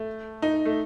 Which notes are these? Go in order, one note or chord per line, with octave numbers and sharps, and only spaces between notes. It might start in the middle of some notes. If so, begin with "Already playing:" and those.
Already playing: A3
D#4
A3